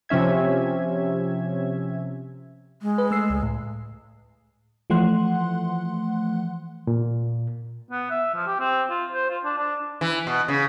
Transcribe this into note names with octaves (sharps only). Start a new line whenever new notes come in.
C3 F3 C#4 E5 G#6
G#3
B4
A3 E6 C7
C#2
A2
E3 F3 A3 F#5 C6 F#6
A#2
B3
E5
F3
G4
C4
F4
C5
F4
D4
D4
E3
B2
C#3